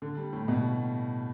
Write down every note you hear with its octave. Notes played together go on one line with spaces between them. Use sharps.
D3
G3
A2
B2